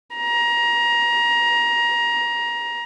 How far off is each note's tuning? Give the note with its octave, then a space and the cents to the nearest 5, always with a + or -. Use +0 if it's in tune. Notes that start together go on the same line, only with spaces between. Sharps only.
A#5 +20